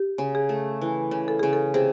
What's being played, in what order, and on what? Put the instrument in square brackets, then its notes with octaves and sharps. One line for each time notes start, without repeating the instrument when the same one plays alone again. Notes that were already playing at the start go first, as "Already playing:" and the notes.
Already playing: [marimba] G4
[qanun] C#3
[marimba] G#4
[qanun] A3
E3
C#3
[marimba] A4
[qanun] C#3 [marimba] G#4
[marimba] A4
[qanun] C3 [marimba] G#4